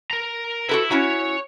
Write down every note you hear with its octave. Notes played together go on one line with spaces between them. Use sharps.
A#4 A#5
E4 F#4 A4 B4
C#4 E4 F#4 C#5